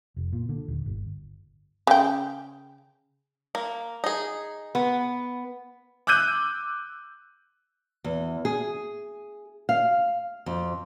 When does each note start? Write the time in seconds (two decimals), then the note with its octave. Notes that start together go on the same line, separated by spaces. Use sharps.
0.16 F1
0.33 A#2
0.49 D3
0.68 D#1
0.86 G1
1.87 C#3 G5
3.55 A#3
4.04 D#4 G#4
4.75 B3
6.07 D6 E6 F#6 G6 D#7
8.04 E2
8.45 G#4
9.69 F5
10.46 F2